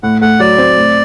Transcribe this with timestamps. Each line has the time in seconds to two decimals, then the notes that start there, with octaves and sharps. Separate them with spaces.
0.03 A2 F#5
0.21 A3 F#5
0.40 F#3 D5
0.58 C4
0.76 A2